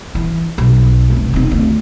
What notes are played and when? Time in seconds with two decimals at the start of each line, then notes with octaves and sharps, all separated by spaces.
0.15 E3
0.58 B1
1.10 F1
1.34 C4 D#4
1.51 D2